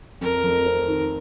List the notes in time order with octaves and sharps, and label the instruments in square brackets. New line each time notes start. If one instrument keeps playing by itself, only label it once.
[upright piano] F2 [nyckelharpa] A#4
[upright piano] F2
C4
D#3